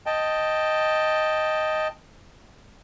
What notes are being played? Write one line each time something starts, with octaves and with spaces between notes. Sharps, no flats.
D#5 G5 A5